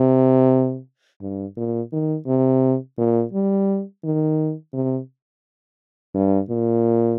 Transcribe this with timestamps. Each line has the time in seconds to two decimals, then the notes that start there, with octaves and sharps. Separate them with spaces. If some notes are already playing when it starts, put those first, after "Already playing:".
Already playing: C3
1.21 G2
1.57 A#2
1.92 D#3
2.27 C3
2.98 A#2
3.33 G3
4.04 D#3
4.73 C3
6.15 G2
6.50 A#2